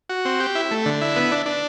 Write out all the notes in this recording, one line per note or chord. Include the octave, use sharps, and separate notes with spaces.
F#4
C4
G4
E4
A3
D3
E4
B3
D4
D4